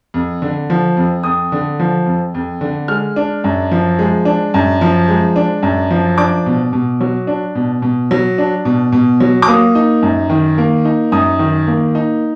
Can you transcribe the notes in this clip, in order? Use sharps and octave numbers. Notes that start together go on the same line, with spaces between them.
F2
D3
F3
F2
F2 D#6
D3
F3
F2
F2
D3
G#3 F6
D4
F#2
F3
G#3
D4
F#2
F3
G#3
D4
F#2
F3
D4 D6
B2
B2
F#3
D4
B2
B2
F#3
D4
B2
B2
F#3
D6
A#3 D#6
D#4
F#2
D#3
A#3
D#4
F#2 D#6
D#3
A#3
D#4